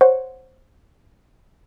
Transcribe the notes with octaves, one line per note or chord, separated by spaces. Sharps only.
C5 C#5 F#5